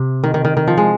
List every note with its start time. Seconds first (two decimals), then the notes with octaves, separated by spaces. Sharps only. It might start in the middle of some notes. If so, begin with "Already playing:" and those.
Already playing: C3
0.24 D#3
0.34 D#3
0.45 D#3
0.57 D#3
0.68 F3
0.78 G#3